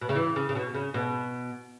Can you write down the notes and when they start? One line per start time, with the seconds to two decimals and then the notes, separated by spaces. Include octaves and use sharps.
0.01 B2
0.09 C#3
0.15 E3
0.36 C#3
0.49 C#3
0.55 B2
0.74 C#3
0.94 B2